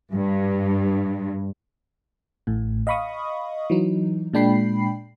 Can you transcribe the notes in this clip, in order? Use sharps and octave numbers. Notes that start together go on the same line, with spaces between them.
G2
A1 A2
D#5 F5 B5 C#6 D#6
E3 F#3 D#4
A#2 G#3 D4 G5 B5 C7